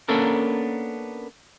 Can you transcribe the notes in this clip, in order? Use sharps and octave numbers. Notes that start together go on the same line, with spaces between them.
A#3 B3 C#4 D4 A4 A#4